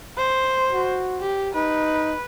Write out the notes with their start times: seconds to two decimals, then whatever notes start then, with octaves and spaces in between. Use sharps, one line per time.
0.17 C5
0.73 F#4
1.20 G4
1.54 D#4 B4